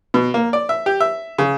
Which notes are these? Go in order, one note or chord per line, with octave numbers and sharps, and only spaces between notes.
B2
A#3
D5
E5
G4
E5
C#3